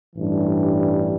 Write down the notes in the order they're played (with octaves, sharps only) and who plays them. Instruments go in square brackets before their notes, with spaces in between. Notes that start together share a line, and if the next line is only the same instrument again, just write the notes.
[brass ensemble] A1 G2 E3 G3 D4